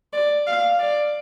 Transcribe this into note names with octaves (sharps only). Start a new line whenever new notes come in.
D5
F5
D5